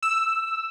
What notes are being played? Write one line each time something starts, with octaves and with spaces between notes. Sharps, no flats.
E6